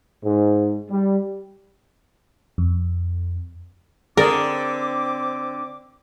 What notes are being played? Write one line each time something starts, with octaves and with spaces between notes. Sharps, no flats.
G#2
G3
F2
D3 C4 G#4 A#4 D5 D6